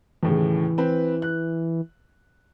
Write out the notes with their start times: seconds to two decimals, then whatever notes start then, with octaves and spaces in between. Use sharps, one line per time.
0.23 D#2 A2 C#3 E3
0.78 C4 B4
1.22 F#6